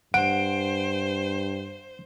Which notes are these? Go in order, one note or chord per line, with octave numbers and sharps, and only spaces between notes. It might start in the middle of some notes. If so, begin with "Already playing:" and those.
G2 C5 F#5 D7